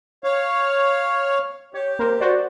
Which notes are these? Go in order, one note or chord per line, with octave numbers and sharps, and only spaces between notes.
C#5 F5
G4 C#5
A#3 A#4 C5
F#4 C5 D5